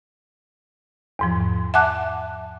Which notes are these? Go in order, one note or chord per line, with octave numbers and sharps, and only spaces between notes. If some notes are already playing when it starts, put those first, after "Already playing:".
E2 G#2 F3
E5 F#5 G#5 A5 D6 F#6